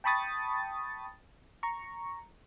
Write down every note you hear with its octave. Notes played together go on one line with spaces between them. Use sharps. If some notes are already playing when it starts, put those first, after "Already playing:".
G5 A5 B5 C#6 D#6 A6
A#5 C#6